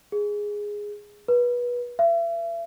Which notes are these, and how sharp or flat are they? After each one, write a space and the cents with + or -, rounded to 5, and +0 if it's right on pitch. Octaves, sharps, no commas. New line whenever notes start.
G#4 -5
B4 -25
E5 +40